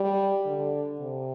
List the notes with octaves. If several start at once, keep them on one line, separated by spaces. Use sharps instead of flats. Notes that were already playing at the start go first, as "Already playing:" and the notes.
Already playing: G3
D3
C3